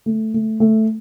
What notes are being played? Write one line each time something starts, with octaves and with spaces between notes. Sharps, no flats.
A3
A3
A3